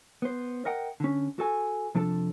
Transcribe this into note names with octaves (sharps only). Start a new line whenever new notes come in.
B3 C5
A#4 D#5 F#5 G5
D3 C#4
F#4 A4 G#5
C3 F3 D4 A4 A5